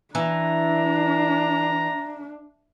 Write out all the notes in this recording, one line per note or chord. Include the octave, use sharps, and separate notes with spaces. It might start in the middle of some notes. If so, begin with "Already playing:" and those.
E3 D4 A#5